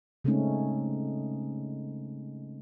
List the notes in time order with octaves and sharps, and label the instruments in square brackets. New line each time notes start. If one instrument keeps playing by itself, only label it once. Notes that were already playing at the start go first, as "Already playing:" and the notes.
[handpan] C#3 G#3 A3 C4 C#4 D#4